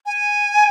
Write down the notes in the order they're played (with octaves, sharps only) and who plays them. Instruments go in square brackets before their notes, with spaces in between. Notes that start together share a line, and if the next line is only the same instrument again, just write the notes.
[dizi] G#5